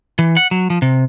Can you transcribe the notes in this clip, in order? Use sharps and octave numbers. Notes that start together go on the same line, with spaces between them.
E3
F#5
F#3
F3
C3